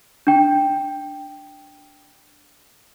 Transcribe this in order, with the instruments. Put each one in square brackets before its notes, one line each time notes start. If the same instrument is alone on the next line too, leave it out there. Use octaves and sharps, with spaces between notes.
[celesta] D4 G5